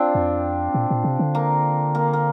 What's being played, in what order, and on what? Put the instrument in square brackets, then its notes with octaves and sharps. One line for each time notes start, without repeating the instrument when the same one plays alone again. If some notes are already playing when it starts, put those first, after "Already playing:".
Already playing: [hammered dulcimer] C4 D4 F4
[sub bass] F2
A#2
A#2
C3
D3
[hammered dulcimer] A#3
A#3
A#3